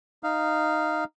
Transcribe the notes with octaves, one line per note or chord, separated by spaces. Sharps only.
D#4 F5